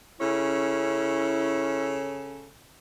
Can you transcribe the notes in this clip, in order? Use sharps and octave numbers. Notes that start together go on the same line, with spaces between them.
C#3 C#4 E4 A4